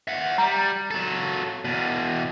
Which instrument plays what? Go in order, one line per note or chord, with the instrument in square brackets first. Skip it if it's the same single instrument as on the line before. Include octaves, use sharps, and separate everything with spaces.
[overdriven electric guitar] E5 F#5
[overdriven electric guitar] G3 [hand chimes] A#5
[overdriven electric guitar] F#3 A4
E2 B2